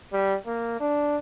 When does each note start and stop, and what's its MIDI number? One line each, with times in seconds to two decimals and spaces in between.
0.13 0.35 55
0.46 0.76 58
0.80 1.17 62